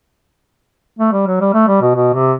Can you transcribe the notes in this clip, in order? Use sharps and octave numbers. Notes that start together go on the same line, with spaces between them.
A3
G3
F#3
G3
A3
G3
B2
B2
C3